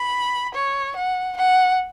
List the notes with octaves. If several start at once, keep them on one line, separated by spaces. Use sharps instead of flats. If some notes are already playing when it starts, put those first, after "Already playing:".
Already playing: B5
C#5
F#5
F#5